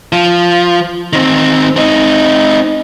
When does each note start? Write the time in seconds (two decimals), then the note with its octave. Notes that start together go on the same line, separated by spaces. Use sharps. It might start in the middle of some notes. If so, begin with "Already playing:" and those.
0.12 F3
1.13 D#3 C4
1.76 C4 D#4